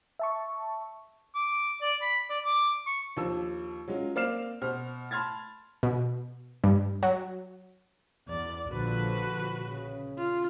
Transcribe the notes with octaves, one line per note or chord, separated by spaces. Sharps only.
E5 A5 C#6
D6
D5
B5
D5
D6
C#6
D#2 F3 D4 E6
F#3 G#3 C#4 F4
A#3 C4 D5 F6 C7 E7
B2 C5 F6
A5 B5 C6 F6 G#6 A6
B2
G2
F#3
E2 D5
A#1 D3 F3 F#4 B4
C#3
F4